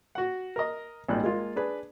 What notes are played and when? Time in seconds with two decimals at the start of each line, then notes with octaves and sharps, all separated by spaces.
0.15 F#4 F#5
0.56 A#4 D#5
1.08 G#1 A#2 G3 D#4 F#6
1.24 G#3 A#3 F4
1.56 D4 G#4 B4